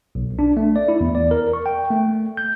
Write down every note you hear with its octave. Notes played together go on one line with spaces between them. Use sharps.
B1
D4
A3
D5
E4
E2
D5
A#4
C#6
G5
A3
G6